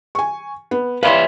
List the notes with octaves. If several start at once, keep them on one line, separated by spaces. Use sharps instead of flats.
G#5 C#6
B3
B4 C#5 E5 F5 B5 C6